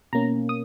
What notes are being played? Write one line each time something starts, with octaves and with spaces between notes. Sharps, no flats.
B2 A#3 C#4 A#5
D#6